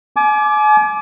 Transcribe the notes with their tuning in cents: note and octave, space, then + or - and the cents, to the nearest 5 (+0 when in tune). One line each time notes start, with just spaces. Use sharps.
G#5 +40 D6 +0